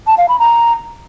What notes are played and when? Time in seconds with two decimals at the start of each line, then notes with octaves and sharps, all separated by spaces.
0.07 A5
0.18 F5
0.29 B5
0.39 A#5